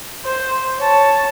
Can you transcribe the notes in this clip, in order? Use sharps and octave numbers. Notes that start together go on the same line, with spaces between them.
C5
C#5 A5